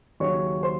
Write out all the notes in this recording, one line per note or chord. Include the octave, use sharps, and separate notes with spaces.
D#2 C#3 F#3 C#4 C#5 C#6
C5 C6